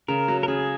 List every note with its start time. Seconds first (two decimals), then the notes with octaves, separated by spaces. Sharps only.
0.08 C#3 A#4
0.28 F#3
0.43 A#4
0.48 C#3 G#4